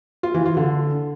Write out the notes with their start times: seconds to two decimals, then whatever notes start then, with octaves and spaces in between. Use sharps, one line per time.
0.23 F4
0.34 E3
0.46 F4
0.57 D3